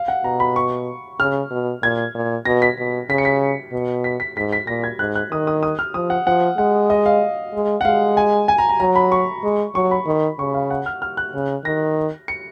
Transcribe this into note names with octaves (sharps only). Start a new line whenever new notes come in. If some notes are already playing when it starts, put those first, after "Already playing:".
Already playing: F5
F#5
B2 A#5
B5
C#6
C#3 F6
B2
A#2 G#6
A#2
B2 A#6
B6
B2
C#3 B6
C#7
B6
B2
B6
B6
G#2 B6
B6
A#2 A#6
G#6
G#2 F#6
F#6
D#3 D#6
D#6
D#6
F6
F3 D#6
F#5
F3 F#5
G#3 F#5
D#5
F5
G#3
F#5
G#3 F5
G#5
G#5
A#5
A#5
F#3 A#5
B5
C#6
G#3
F#3 C#6
B5
D#3
C#3 C#6
F5
F#5
F6
F6
F#6
C#3
D#3 A#6
C#7